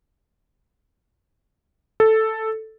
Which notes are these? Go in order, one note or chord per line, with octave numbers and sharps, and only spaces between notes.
A4